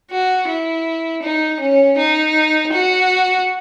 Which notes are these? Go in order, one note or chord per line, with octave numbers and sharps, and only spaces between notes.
F#4
E4
D#4
C#4
D#4
F#4